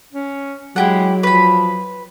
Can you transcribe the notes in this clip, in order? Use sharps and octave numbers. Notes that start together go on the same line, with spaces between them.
C#4
F#3 G#3 E4 G4 F#5
F3 B4 B5